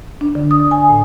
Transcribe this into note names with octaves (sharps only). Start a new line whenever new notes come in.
D4
D3
D#6
G#5
A2